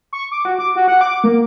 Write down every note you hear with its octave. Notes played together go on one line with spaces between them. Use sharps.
C#6
D6
F#4
D6
F#4
F#5
D6
A#3